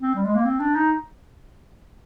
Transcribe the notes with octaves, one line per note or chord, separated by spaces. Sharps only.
C4
G3
G#3
A#3
C4
D4
D#4